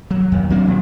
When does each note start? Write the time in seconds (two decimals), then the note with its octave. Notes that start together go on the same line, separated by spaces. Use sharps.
0.11 F#3
0.32 D#2
0.50 F#3 A#3 C4 D4
0.66 D#1 A#1 F3